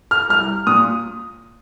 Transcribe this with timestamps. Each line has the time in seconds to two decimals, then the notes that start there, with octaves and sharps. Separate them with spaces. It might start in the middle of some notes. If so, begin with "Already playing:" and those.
0.11 F6
0.29 C2 F6
0.67 A#2 D#6